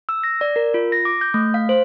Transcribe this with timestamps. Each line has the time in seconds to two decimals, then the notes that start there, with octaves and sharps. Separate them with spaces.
0.09 E6
0.24 A#6
0.41 D5
0.56 A#4
0.74 F4
0.92 A#6
1.05 D6
1.21 G6
1.34 A3
1.54 F5
1.69 C5